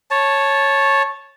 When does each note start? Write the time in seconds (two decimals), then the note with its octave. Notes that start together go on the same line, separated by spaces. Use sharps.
0.11 C#5 A5